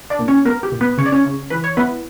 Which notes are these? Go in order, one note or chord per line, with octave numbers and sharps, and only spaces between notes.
D4 D5
A#2
C#4 C#5
B3 A#4
G4
A#2
B3 B4
C#3 C#5
D5
C#4 C#5
C#3
E3 B4
C#5
B3 E4 B4